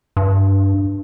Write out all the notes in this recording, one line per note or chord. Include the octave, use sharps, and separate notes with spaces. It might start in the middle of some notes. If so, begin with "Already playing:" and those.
G2